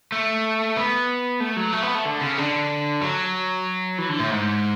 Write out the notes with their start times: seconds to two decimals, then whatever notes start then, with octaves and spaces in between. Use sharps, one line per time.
0.12 A3
0.77 B3
1.40 A3
1.56 F#3
1.73 A3
1.83 B3
1.95 A3
2.05 D3
2.21 C#3
2.38 D3
3.02 F#3
3.98 E3
4.09 D3
4.20 A2
4.30 G#2